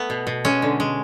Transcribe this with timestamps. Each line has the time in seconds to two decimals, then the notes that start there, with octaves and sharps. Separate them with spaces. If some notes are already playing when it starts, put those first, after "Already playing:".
Already playing: A3 B3
0.10 B2
0.27 B2
0.45 G#3 C#4
0.62 D3
0.80 G#3